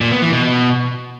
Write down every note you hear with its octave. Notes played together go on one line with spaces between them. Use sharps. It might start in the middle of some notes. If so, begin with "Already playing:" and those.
A#2
B3
E3
B2